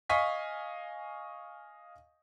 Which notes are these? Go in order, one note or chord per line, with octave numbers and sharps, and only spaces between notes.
D#5 F5 G#5 C#6 B6